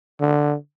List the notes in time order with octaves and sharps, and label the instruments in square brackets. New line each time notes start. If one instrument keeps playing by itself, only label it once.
[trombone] D3